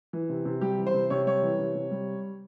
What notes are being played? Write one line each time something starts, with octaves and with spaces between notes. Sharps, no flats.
E3
C3
C3
G3 G4
E3
C5
C3
C3 C#5
G3 C#5
E3
C3
C3
G3